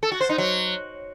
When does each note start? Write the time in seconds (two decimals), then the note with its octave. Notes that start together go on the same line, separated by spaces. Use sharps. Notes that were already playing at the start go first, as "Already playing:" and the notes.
0.03 A4
0.12 F#4
0.20 C5
0.29 D#4
0.38 F#3